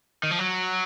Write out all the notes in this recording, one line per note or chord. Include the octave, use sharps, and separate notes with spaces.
D#3
F3
F#3